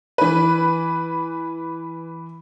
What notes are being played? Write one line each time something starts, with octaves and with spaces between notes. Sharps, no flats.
E3 B4